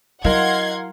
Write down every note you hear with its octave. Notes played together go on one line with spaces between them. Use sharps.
F#3 E4 A#4 D#5 F5 F#5 C6 G#6